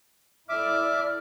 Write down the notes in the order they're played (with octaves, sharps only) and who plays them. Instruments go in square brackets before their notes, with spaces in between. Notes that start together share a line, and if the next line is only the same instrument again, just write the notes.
[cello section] E4 A4 D5 [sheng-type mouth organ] E5 D6 [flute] F6